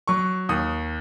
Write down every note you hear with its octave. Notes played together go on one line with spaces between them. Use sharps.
F#3 C#6
D#2 D#6